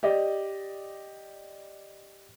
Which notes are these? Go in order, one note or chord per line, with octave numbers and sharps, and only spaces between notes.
G4 D5 D#5